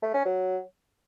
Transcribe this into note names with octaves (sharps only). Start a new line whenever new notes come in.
A3
C#4
F#3